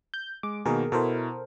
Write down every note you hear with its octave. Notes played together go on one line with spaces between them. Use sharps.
G6
G#3 D6
B2 D#3 A#3 G#4 A#4
B2 E4 A4 A#4 C5